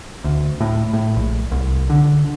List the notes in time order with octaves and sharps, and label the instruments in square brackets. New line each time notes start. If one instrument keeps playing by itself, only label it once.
[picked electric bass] D2
A2
A2
A#1
C2
D3